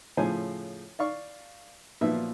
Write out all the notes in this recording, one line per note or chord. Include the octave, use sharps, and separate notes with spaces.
A2 C#3 F3 C5 G#5
D5 F5 C#6
B1 A#2 F3 B4 E5